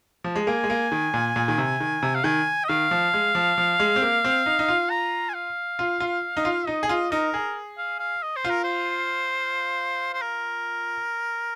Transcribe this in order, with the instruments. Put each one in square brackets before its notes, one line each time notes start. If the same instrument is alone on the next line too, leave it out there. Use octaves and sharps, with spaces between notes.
[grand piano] F3
G#3
[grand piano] A#3 [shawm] G#5
[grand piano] G#3
A#3
D#3
A#2
A#2
D#3
C3
D#3
C3
[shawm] F5
[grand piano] D#3 [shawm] G#5
[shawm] D#5
[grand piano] D#3 [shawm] F5
[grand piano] F3
G#3
F3
F3
G#3
C4
A#3
C4
D#4
D#4
F4
[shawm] A#5
G#5
F5
[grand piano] F4
F4
D#4
F4
[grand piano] D#4 [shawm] D#5
[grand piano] G#4
F4
[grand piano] D#4 [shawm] A#4
[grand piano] G#4
[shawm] F5
F5
D#5
C5
[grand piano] F4
[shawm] A#4
C5
C5
A#4